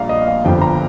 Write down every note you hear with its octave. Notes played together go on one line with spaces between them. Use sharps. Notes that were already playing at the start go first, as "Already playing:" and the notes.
Already playing: A#1 A#2 G3 F5 A#5
D#5
F5
G1 G2 F3 G5
A#5